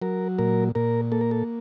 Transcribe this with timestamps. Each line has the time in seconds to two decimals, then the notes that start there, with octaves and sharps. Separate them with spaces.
0.02 F#3 A#4
0.39 A#2 A#4
0.75 A#2 A#4
1.12 A#3 A4
1.21 A#4
1.31 A4